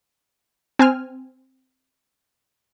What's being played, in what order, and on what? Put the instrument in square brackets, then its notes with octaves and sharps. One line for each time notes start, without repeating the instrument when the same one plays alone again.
[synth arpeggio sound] C4 G#5 F6